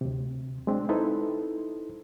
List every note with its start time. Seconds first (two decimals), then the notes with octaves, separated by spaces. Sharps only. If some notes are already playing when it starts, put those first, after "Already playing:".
0.01 D2 C3
0.67 G#3 C4 D4
0.89 D#4 E4 A4 B4 C5